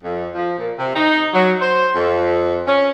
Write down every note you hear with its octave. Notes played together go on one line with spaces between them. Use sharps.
F2
F3
A#2
C3
D#4
F#3
C5
F2
C#4